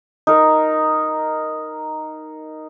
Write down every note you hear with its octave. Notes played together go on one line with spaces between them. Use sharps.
D#4 A#4